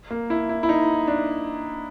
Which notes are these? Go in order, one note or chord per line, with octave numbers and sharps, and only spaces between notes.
A#3
E4
E4
E4
D#4
D4